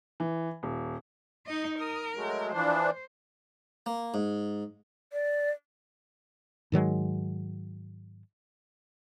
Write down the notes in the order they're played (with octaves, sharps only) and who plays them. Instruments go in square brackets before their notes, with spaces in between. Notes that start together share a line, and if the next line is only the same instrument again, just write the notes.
[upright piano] E3
D#1
[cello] D#4 D#5
[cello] A#4 [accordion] D#6
[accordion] F#3 G#3 A3
[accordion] E3 F3 D4 [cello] C5
[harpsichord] A#3
G#2
[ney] D5
[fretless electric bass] G#2 D#3 F#3 G#3